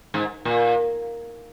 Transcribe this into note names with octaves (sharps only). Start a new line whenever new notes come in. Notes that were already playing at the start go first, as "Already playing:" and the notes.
G#2
A#2